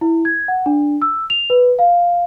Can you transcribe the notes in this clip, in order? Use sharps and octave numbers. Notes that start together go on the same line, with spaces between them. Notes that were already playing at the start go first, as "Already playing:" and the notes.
E4
G#6
F#5
D4
E6
F7
B4
F5